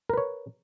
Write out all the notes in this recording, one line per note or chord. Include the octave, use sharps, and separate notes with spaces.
A#4 B4 C#5